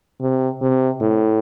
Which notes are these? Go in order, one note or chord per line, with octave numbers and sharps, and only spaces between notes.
C3
C3
A2